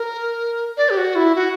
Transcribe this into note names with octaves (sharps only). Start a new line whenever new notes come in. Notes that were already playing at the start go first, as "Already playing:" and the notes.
Already playing: A#4
D5
G4
F#4
E4
F#4